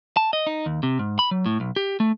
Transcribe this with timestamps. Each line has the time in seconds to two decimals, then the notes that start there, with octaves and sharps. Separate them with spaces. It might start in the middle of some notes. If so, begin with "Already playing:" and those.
0.17 A5
0.33 D#5
0.47 D#4
0.66 D#2
0.83 C3
0.99 G#2
1.19 B5
1.31 F#3
1.46 A2
1.60 B1
1.76 G4
2.00 A3